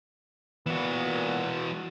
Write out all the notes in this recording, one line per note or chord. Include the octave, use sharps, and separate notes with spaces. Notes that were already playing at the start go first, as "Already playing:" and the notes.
A#2 E3 B3 F#4